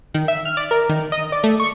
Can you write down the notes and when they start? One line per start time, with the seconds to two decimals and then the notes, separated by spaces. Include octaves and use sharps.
0.14 D#3
0.28 E5
0.45 F6
0.57 D5
0.71 A#4
0.89 D#3
1.12 D#5
1.32 D5
1.44 A3
1.60 C#6